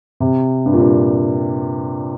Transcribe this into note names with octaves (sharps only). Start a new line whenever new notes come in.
C3
G2
A#2
G2